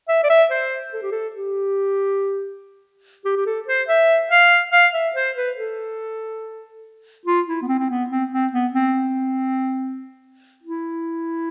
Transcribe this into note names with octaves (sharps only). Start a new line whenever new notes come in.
E5
D5
E5
C5
A4
G4
A4
G4
G4
G4
A4
C5
E5
F5
F5
E5
C5
B4
A4
F4
E4
B3
C4
C4
B3
C4
C4
B3
C4
E4